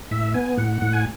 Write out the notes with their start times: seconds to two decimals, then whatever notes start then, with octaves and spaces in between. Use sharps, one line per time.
0.11 A2 E5
0.34 B3 G#5
0.57 A2 F#5
0.82 A2
0.93 G#5